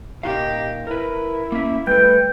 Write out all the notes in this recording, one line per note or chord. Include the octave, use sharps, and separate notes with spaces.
A#2 D#4 G4 D#5 F5
E4 A#4 B4
A#3 C#4 E5
G3 A3 B4 G5